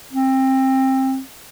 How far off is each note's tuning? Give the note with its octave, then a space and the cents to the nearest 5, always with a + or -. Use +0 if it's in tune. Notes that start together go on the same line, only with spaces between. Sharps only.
C4 +20